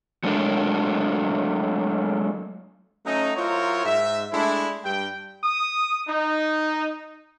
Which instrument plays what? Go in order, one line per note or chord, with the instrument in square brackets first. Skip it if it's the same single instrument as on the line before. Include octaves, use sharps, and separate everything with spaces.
[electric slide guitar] F#3 G#3 A3 D4 A#4
[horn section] F#3 A3 C#4 D#4
F#3 E4 F4 A#4 C5 C#5
G#2 E5
G#3 A3 D4 E4
G2 G5
[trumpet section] D#6
D#4